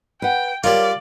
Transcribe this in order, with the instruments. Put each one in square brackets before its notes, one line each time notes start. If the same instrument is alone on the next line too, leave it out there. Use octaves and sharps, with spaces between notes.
[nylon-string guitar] B4 F#5 [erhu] G5
[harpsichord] G3 F4 [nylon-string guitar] A#4 C#5 [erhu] D5